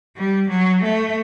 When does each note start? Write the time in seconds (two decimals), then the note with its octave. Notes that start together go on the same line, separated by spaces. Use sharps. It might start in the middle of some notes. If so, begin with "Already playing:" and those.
0.17 G3
0.50 F#3
0.83 A3